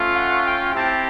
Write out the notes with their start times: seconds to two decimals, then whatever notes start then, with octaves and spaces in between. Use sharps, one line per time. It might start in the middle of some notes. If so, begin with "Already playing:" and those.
Already playing: A3 C#4 F4
0.13 F#5
0.44 G5
0.73 C4 E4 G4 A5